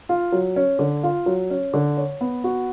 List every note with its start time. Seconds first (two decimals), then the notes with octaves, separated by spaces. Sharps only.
0.09 F4
0.32 F#3
0.56 C#4
0.79 D3
1.03 F4
1.26 F#3
1.50 C#4
1.74 D3
1.97 C#5
2.21 B3
2.44 F#4